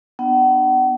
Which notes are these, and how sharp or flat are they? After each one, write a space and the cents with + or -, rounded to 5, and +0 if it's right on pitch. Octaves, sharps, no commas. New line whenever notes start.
B3 +0 D4 +25 F#5 +40